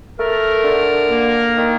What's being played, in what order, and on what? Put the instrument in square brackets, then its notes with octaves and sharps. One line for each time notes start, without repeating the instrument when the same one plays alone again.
[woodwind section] A3 A#4
D3
A#3
D#3